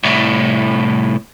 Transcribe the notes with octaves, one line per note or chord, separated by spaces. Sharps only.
C2 A2